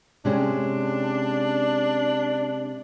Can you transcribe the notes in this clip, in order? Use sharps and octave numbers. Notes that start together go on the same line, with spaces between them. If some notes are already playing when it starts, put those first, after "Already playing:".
C3 G#3 C#4 D4